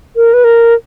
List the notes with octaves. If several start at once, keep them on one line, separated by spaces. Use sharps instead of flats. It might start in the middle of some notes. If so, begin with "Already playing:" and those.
A#4
B4
A#4